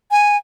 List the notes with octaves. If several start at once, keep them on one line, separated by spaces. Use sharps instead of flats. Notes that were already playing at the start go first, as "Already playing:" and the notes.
G#5